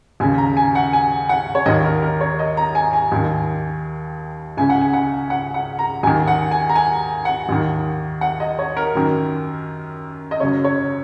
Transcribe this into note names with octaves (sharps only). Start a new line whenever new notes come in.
D#2 C#3 G#5
A#5
G#5
F#5
G#5
F#5
C#5
D#2 D#3 D#5
A#4
A#4
C#5
D#5
A#5
G#5
G#5
D#2 D#3
C#2 C#3 G#5
F#5
G#5
F#5
F#5
F#5
A#5
D#2 D#3 G#5
F#5
G#5
A#5
G#5
F#5
D#2 D#3
F#5
D#5
C#5
A#4
F#2 D#3
D#5
F#2 C#3 C#5
C#5